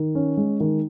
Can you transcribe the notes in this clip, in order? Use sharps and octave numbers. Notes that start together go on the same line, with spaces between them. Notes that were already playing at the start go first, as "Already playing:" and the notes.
Already playing: D#3
C#4
G#3
D#3